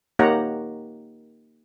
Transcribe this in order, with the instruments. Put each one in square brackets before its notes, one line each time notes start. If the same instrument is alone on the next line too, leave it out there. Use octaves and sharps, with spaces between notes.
[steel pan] A#3 D#4 G4 C#5 F#5 A#5